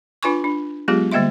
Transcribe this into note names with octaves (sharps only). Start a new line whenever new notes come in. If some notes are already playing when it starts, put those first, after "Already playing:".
D4 F4 B4 G#5 C6 C#6
D4
F#3 G#3 B3 F4 G4 G#4
D3 G3 A#3 D#5 E5 C6